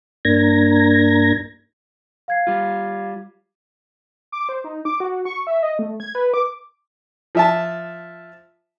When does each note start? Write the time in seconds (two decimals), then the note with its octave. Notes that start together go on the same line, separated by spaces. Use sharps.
0.25 G2 A#3 D4 A#5 G#6 A#6
2.28 F5 G#6 C7
2.47 G3 F4
4.32 D6
4.49 C5
4.64 D#4
4.85 D6
5.00 F#4
5.25 C#6
5.47 E5
5.63 D#5
5.79 A3
6.00 G#6
6.15 B4
6.34 D6
7.35 F3 E5 A5